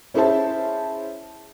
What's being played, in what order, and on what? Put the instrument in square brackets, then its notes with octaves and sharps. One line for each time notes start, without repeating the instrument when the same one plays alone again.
[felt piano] C#4 E4 G#4 C5 E5 A5